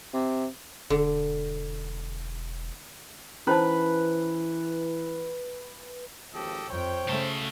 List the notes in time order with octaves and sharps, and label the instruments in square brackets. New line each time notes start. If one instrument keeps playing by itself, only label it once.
[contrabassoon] C3
[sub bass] E1 [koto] D3
[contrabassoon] E3 [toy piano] C#4 C5 A5 [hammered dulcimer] B4
[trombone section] G#1 D#2 F3 [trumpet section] G4 A4 D#5
[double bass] F2 [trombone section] C5 [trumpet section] C#5 G5
[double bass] C#3 A3 [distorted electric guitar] F#4 A5